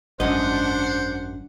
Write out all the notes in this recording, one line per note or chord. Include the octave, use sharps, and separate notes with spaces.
G#1 F#2 D4 C5 D#5 F#5